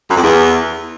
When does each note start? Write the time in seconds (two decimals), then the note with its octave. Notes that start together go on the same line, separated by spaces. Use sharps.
0.09 F#2
0.16 F2
0.23 E2